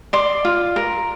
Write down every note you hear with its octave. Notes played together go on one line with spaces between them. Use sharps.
D5 C6
F4
A#4